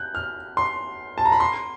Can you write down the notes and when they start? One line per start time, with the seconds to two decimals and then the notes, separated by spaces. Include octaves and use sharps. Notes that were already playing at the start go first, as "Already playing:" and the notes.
Already playing: F#6 G6
0.15 F6
0.57 C6
1.18 A5
1.25 A#5
1.32 B5
1.40 C6